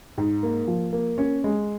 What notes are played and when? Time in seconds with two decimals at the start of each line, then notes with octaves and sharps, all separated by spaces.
0.18 G#2
0.43 A#3
0.68 F3
0.93 A#3
1.18 C#4
1.44 G#3